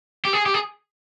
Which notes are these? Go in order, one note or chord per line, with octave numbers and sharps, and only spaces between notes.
G4
G#4
G4
G#4